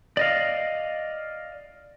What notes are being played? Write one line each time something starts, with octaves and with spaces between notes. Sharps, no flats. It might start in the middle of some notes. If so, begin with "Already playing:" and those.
D5 D#5 F5